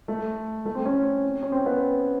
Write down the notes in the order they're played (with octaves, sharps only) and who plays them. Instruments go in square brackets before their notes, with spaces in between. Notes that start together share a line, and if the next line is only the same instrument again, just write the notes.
[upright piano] A3
A3
C4
C#4
C#4
C4
B3